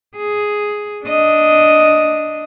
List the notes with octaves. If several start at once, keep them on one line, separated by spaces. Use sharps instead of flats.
G#4
D4 D#5